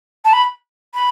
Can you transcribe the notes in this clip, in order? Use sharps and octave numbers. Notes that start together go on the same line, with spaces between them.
A5
B5
B5